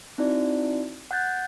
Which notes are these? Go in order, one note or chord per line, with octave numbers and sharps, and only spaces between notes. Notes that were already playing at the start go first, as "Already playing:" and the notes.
C4 D#4 E4 F#4 D5
F#5 F#6 G6 A6